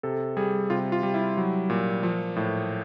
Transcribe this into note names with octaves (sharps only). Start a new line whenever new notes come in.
C3 A4
G3 G#4
C3 F4
F4
G3
E4
F#3
A#2
F3
A2